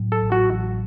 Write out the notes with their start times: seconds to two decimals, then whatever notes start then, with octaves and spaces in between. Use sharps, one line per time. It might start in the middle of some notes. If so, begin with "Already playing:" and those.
Already playing: A2 F#3
0.12 A4
0.22 A1
0.32 F#4
0.51 A1